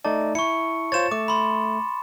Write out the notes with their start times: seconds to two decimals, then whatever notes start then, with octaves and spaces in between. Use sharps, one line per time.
0.05 A3 D#4 D5 A5
0.35 E4 C#6 C#7
0.92 F4 C5 C#5 A6 E7
1.11 A3 D6
1.28 B5 C6